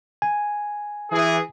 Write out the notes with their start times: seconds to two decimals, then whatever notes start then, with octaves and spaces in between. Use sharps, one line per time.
0.22 G#5
1.11 E3 G#4